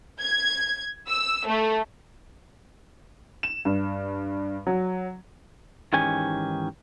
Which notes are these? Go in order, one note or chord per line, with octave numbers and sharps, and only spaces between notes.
G#6
E6
A3
E7
G2
F#3
G#2 D#3 E3 C#4 G4 G#5